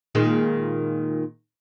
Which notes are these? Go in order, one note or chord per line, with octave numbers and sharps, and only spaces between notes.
A#2 D#3 G#3